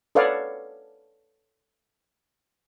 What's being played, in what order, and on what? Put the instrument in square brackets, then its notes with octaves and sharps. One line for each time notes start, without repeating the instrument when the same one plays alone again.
[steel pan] A4 B4 C#5 D5 F5 F#5